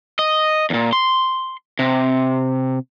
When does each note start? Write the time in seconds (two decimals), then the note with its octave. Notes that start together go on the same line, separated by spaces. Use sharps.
0.19 D#5
0.70 E2 A#2
0.93 C6
1.79 C3